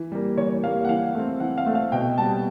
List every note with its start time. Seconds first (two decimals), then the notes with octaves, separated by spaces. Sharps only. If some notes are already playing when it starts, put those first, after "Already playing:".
Already playing: E3
0.12 G3 A#3
0.37 E3 C#5
0.64 G3 A#3 F5
0.85 F#5
0.89 E3 F5
1.15 A3 C4
1.40 E3 F#5
1.58 F5
1.66 A3 C4
1.75 F5
1.92 B2 G5
2.18 G3 B3 A5